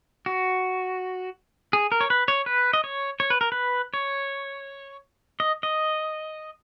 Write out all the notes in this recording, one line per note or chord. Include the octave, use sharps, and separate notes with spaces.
F#4
G#4
A#4
C#5
B4
C#5
B4
D#5
C#5
C#5
B4
A#4
B4
C#5
D#5
D#5